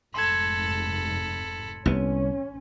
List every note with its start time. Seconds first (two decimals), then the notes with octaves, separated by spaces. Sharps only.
0.14 F1 G#2 A4 B5 C6 G#6
1.86 C2 B3 C#4